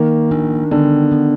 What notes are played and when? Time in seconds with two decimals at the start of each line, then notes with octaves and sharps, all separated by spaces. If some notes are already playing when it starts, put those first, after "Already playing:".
Already playing: D#3 A#3
0.31 D4
0.71 D3 B3
1.12 B3